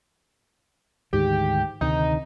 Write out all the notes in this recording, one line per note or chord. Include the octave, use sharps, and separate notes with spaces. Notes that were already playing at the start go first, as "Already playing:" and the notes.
D2 G#2 D#3 G4
D2 C3 D#3 D#4